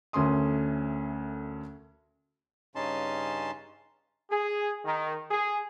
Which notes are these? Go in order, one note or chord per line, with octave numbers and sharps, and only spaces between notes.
D2 A3 C#4 A#4 C6 D#6
G2 C#3 C#4 D#4 A5 C6
G#4
D#3
G#4